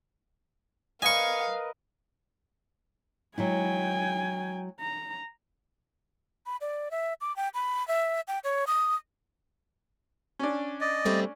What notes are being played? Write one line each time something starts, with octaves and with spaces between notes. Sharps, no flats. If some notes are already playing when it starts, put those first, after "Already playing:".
A#4 B4 D#5 F5 G#5 C#6
F#3 G#3 E4 G5 G#5
A#5
B5
D5
E5
D6
G5
B5
E5
G5
C#5
D#6
C#4 D4
D5 D#5
G3 A3 C4